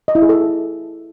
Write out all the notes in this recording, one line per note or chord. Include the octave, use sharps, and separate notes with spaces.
D#5
E4
G#4
A4